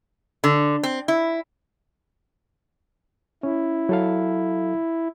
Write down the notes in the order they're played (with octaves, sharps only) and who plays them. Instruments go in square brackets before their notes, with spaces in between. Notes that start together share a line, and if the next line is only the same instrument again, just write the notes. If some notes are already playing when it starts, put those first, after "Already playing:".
[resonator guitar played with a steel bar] D3
C4
E4
[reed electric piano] C#4 [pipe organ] E4
[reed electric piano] F#3 A4 F5